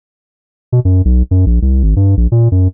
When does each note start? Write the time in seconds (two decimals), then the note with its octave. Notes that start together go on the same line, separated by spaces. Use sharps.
0.72 B2
0.85 F#2
1.05 B1
1.31 F#2
1.46 A#1
1.62 C2
1.83 G#1
1.96 G2
2.17 A#1
2.32 A#2
2.52 F#2